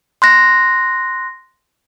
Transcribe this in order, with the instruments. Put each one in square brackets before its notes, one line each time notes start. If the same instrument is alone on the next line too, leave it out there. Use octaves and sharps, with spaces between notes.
[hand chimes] C6 F#6 A#6